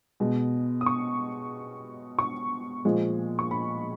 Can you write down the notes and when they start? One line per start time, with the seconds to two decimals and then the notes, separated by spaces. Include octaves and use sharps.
0.20 B2 G#3
0.81 D#6
0.86 C#6
2.19 C#6
2.85 A#2 F3 G#3
3.39 C#6
3.51 B5